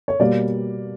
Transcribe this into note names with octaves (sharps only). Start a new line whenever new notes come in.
C#5
B2 G3 A#3 D5